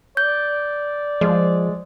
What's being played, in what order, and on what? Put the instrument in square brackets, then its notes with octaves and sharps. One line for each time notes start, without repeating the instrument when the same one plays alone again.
[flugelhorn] D5 [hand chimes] G6
[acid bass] F3 [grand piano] G#3